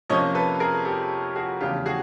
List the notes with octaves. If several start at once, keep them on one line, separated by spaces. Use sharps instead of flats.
F2 C3 F3 A#3 C#4 C#5 D#5
A4 B4
G#4 A#4
G4 A4
F#4 G#4
E2 C#3 F3 A3 F4 G4
F#4 G#4